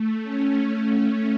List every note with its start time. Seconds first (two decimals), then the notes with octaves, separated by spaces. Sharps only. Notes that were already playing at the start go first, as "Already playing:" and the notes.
Already playing: A3
0.22 A3 C#4